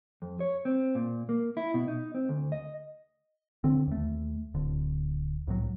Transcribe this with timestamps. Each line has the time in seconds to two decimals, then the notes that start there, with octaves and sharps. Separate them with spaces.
0.22 F2
0.40 C#5
0.65 C4
0.95 A#2
1.29 A#3
1.57 E4
1.74 B2
1.88 D#4
2.15 C4
2.29 D2
2.52 D#5
3.64 D3 C4
3.87 D#2 A3
4.54 D1 D3
5.47 C2 A2 F#3